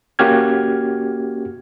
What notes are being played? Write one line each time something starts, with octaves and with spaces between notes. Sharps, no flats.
A#3 C#4 F#4 G4 F6 G#6